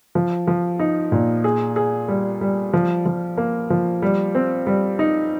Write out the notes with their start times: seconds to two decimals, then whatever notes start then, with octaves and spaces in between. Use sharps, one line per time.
0.15 F3
0.47 F3
0.79 D#4
1.12 A#2
1.44 G#4
1.76 G#4
2.08 G3
2.41 G3
2.73 F3
3.06 F3
3.37 A#3
3.70 F3
4.02 G3
4.35 C4
4.67 G3
4.99 D#4